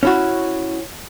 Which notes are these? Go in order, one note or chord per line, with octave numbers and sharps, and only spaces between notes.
C#4 E4 F#4